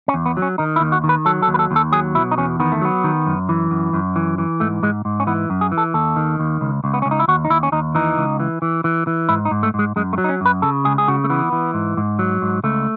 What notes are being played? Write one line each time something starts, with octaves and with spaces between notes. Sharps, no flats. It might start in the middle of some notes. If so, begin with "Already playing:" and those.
C#4
E2
B3
F#3
C#4
D#3 D#4
E4
D#2
F#4
D#3
B4
F#3 A4
A4
D#2
B4
A4
D#2
A4
F#3 G#4
B2 E4
D#4
E2 C#4
D#3 B3
A3
F#3 B3
D#3
F#2
E3
F#2
F#2
E3
E3
G#2 A3
G#2 G#3
G#2
C#4
E3 B3
F#2
G#4
E3
A4
D#2 A4
D#3
D#2
C#2
C#2
B3
C#2 C#4
D#4
E4
D#2 F#4
D#4
D#2 E4
C#4
D#2 D#4
E3 D#4
C#2
E3
E3
E3
E3
G#2 E4
D#4
G#2
A3
G#2 G#3
F#2 G#3
A3
F#3
D#4
C#4
F#2 B4
C#3 A4
C#2 G#4
G#4
C#3 F#4
A3
E3 B3
E3
G#2
G#2
F#3
G#2
C#2 A3